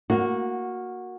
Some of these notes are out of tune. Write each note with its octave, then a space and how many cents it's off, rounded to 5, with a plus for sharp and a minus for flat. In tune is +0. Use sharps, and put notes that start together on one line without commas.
A#3 +0 F#4 -15